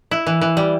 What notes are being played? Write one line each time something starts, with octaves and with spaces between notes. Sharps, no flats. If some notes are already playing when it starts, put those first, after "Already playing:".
E4
E3
E3
G3